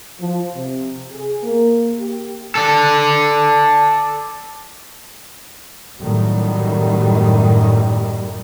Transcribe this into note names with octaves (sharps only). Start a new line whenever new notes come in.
F3
C3
G#4
A#3
G4
A4 D5
F#2 A2 D#3 F#3 G3